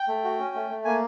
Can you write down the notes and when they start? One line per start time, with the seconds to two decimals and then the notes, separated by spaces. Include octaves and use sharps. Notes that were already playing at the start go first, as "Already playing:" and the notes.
Already playing: G5
0.08 A3
0.24 F#4
0.39 C#4
0.55 A3
0.70 A3
0.85 A#3 G#5